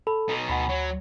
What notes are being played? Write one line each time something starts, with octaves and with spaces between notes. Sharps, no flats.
A4 B5
B2 D#4
D2 F#5 G#5 B5
F#3